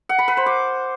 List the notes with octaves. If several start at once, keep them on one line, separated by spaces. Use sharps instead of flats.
F#5
B5
B4
C5
D6